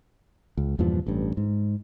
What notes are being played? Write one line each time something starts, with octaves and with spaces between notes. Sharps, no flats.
C#2
E2 G2 A#2 F3
A1 G2
G#2